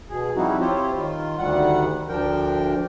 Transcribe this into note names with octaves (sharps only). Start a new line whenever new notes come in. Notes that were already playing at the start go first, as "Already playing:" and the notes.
B2 G#4
F3 G3 C4 D#4 E4 F#4
C4 E4 F4 G4 C5 C#5
D#3 F4
D2 D#3 G3 F#5
D2 F3 D4 A#4 G5